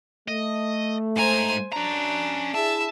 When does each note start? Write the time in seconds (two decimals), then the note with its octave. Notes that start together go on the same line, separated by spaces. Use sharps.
0.28 A3 D#5
1.16 G#2 C5 G#5 A#5
1.73 C#4 D4 A#5
2.55 E4 G#4 E5 A5